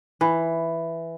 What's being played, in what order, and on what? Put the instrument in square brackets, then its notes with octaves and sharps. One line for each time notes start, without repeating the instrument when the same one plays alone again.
[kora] E3